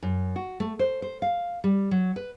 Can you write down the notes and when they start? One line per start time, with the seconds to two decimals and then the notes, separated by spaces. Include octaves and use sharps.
0.03 F#2
0.36 F#4
0.60 A3
0.79 C5
1.02 C5
1.22 F5
1.64 G3
1.91 F#3
2.16 B4